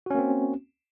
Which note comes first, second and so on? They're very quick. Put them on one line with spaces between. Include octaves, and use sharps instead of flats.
F#4 C#4 A#3 C4